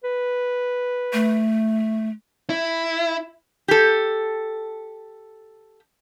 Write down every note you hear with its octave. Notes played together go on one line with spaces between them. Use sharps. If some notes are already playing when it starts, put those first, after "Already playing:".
B4
A3
E4
G4 A4